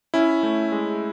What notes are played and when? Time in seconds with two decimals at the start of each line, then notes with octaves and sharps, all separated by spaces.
0.14 C#4 E4
0.43 A3
0.72 G#3